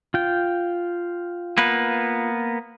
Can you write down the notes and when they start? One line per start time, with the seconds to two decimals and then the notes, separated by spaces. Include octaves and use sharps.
0.14 F4 G5
1.58 A#3 B3 B4